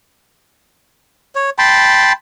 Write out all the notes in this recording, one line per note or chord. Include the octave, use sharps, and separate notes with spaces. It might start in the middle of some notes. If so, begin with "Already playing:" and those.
C#5
G5 A5 B5 C6